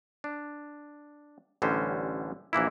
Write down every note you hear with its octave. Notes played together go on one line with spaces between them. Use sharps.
D4
A1 D3 G3 C#4 C5
A#1 E3 A#3 E4